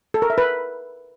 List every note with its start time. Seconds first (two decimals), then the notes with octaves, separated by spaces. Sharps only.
0.14 A4
0.22 A#4
0.30 E5
0.38 B4